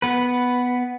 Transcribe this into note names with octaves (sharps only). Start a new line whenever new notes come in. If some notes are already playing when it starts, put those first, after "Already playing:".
B3 B4